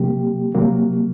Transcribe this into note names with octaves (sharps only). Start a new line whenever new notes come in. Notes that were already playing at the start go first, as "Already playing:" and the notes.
Already playing: C3 F#3 A#3 G4
C3 F#3 A#3